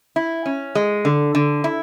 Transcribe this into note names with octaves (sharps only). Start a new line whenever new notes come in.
E4
C#4
G#3
D3
D3
E4